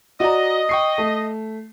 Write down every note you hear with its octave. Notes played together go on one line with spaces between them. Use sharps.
F#4 D5 D#5 A#5
G5 C#6 C7
A3